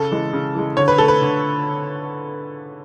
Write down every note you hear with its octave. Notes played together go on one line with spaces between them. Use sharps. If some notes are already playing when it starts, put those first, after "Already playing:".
Already playing: C#3 A4
E3 G#3
C#3
E3 G#3
D3 C#5
B4
A3 A4
B4
D3